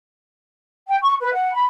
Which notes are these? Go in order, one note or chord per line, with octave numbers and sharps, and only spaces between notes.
G5
C#6
B4
F#5
B5